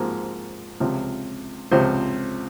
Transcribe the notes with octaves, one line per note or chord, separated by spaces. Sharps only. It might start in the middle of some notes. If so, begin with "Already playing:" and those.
Already playing: G#2 F3 A#3
C#2 C3 F3
C#2 C3 F3 C5